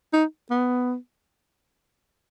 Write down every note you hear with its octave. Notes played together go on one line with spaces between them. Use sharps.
D#4
B3